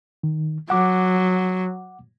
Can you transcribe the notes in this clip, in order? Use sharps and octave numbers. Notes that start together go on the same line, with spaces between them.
D#3
F#3 F#5 D6